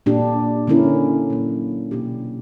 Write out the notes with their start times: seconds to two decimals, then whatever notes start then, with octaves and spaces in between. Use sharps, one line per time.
0.06 A#2 A#3 D4 G4
0.67 D3 A#3 C#4 E4 A#4
1.30 A#2 F#3 A#3
1.91 B2 A#3 D4 G4